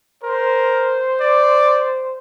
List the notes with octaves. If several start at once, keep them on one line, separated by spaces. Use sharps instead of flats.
A#4 C5
D5